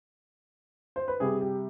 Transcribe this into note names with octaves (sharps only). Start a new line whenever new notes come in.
C5
B4
C3 G3 G#4
G4